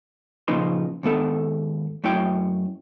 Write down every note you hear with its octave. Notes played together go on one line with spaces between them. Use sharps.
A#2 C#3 F3 D#4 B4 C6
D#2 G#2 B3 A4
F#2 A3 E4 C#5 G5